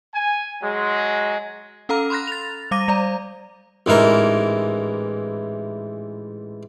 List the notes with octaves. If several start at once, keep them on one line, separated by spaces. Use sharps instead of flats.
G#5
F#3 G#3
C#4 A4 F5 A#5 F6
B5 C6 F6 F#6 A#6
A6 F7
G3 F5 D6 A#6 D#7
G3 D5 A#5
A1 G#2 E3 A#4